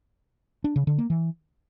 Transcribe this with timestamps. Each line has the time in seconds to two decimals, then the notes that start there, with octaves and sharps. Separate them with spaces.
0.64 D4
0.76 C#3
0.87 D3
0.98 A#3
1.10 E3